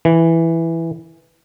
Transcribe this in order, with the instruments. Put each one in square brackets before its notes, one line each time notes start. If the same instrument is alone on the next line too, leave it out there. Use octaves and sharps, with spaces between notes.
[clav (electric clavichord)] E3